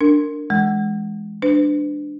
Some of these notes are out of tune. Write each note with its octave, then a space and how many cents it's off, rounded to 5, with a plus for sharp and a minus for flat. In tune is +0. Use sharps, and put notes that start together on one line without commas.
D4 +0 A#4 -15
E3 +0 G#3 +0
D4 +10 B4 +40